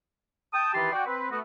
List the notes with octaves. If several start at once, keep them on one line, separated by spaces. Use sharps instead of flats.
G5 A5 D#6
D#3 E3 G4 B4 A5 C6
F#4 D5 G5
C4 B4
A3 B3 F#4